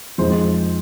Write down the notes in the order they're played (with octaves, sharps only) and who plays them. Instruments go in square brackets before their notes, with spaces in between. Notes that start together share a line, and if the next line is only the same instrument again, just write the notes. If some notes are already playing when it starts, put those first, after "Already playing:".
[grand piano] F2 F3 G#3 D#4 C5